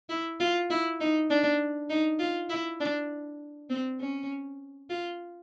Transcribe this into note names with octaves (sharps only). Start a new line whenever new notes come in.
E4
F4
E4
D#4
D4
D#4
F4
E4
D4
C4
C#4
F4